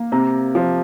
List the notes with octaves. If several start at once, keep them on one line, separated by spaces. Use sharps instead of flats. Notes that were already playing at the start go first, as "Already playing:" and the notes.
Already playing: A#3
C3 A#5
F3